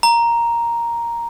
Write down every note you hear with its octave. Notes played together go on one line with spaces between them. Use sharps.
A#5